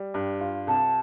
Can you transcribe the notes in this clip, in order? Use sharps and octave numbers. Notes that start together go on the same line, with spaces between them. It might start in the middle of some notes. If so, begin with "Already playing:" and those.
Already playing: G3
G2
F4
C2 A5